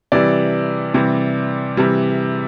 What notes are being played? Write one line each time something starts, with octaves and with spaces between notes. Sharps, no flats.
C3 E3 G3 D5
C3 E3 G3
C3 E3 G3